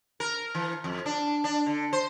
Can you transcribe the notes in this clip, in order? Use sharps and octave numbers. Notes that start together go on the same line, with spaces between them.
A#4
E3
F2
D4
D4
D3
C5